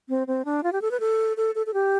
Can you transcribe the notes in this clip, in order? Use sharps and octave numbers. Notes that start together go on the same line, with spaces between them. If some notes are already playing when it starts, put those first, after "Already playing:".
C4
C4
D4
F4
G4
A4
B4
A4
A4
A4
A4
G4